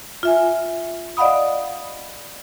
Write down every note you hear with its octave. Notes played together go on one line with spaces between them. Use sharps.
F4 E5 G#5
D5 D#5 F5 F#5 B5 D#6